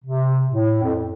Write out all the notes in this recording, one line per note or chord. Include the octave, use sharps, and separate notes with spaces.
C3
A2
F2